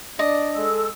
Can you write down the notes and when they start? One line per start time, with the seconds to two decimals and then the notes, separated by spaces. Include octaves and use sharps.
0.19 D4 D5 D#5
0.56 G#3 A4 E6